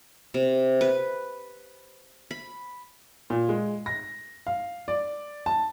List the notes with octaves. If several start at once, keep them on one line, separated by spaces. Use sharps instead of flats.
C3
B4
B5
A#2
G#3
A#6
F5
D5
A5